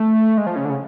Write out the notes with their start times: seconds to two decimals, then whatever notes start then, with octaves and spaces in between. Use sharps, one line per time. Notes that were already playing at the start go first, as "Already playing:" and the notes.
Already playing: A3
0.38 G#3
0.46 F3
0.56 C#3
0.65 D3
0.70 C#3